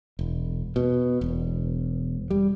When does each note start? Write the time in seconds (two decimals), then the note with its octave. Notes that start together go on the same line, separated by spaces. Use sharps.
0.19 E1
0.76 B2
1.21 E1
2.30 G3